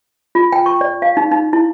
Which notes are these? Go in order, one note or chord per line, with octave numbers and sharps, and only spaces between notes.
F4
G5
C#6
D5
F5
D#4
D#4
E4